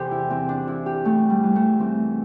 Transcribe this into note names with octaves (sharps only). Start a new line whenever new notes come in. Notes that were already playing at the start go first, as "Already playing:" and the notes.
Already playing: E2 C3 E3 G4 A4 C5 D5
E4
E3 C4
D4
E2 E4
G4
E2 A3
G3
E3
A3
E3 C4